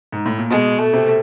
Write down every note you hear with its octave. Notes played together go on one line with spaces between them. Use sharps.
G#2
A2
A#2
B2 G#3
A3
C3